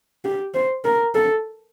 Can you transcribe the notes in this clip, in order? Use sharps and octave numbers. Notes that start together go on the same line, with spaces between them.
G4
C5
A#4
A4